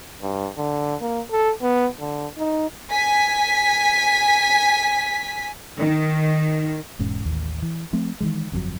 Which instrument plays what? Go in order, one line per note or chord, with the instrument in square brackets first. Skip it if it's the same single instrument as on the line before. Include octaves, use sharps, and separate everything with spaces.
[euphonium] G2
D3
A#3
A4
B3
D3
D#4
[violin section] G#5 B6
[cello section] D#3
[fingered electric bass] E1 G#2 C#4
A1 D#2
E3
F3 A3 C4
D#3 E3 G#3
G1 F2 C3 F#3